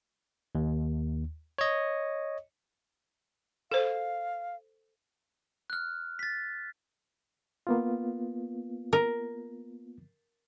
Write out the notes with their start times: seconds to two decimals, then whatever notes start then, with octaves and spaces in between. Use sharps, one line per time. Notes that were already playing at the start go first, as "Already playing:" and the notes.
0.55 D#2
1.58 C#5 D#5
3.72 A4 C5 F5
5.70 F6 F#6
6.19 A6 B6
7.67 A#3 B3 F4
8.93 A#4